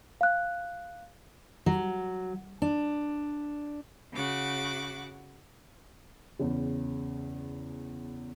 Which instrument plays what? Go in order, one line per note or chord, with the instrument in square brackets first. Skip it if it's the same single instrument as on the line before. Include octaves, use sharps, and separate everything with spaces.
[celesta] F5 F#6
[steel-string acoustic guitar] F#3
D4
[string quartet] C#3 F#4 F#5 D6
[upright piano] E2 C#3